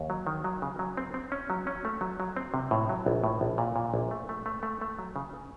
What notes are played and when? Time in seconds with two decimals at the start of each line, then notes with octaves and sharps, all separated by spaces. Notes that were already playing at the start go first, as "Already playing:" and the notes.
Already playing: D#2
0.10 F#3
0.27 D#3
0.44 F#3
0.62 C#3
0.79 F#3
0.97 C4
1.14 C4
1.32 C#4
1.50 F#3
1.67 C#4
1.85 A3
2.01 F#3
2.20 F#3
2.37 C4
2.54 C3
2.71 A2
2.89 F#3
3.06 A#1
3.24 A2
3.41 A#1
3.58 A#2
3.76 A#2
3.94 A#1
4.11 A3
4.29 A3
4.46 A3
4.63 A3
4.81 A3
4.99 F#3
5.16 C#3